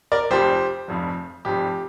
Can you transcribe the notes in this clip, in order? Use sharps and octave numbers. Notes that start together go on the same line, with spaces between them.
A#4 D5
F1 F2 F3 G4 C5
F1 F2 F3
F1 F2 F3 G4